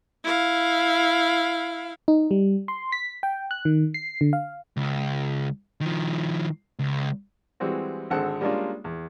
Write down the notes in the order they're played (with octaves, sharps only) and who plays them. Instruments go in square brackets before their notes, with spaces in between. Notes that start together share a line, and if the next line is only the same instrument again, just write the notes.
[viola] E4 F5
[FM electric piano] D#4
G3
C6
B6
G5
F#6
D#3
C7
D3
F5
[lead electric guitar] C#2
D#3 F3
C#2
[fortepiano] E3 G3 G#3 C4 F#4
G#1 D3 G#3 A4 C5 F#5
G3 G#3 A#3 C#4 D4 F4
E2